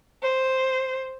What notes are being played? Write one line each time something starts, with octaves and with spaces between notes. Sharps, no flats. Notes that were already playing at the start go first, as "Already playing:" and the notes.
C5